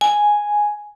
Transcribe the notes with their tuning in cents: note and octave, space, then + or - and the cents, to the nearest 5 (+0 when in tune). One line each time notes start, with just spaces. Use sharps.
G#5 +0